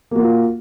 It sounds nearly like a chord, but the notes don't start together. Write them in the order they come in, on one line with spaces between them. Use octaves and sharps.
A#3 F#4 F4